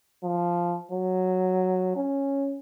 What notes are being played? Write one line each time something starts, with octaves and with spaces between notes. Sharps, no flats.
F3
F#3
C#4